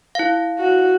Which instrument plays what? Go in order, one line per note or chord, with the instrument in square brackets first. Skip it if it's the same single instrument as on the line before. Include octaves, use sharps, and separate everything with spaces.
[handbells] E4 F5
[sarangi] F#4